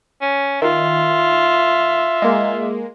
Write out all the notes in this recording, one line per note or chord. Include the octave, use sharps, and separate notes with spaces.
C#4
D#3 F4 E5
G#3 A#3